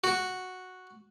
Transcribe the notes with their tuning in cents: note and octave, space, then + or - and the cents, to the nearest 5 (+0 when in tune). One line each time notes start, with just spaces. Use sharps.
F#4 -5